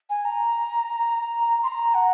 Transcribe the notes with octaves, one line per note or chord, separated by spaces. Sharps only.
G#5
A#5
C6
A#5
F#5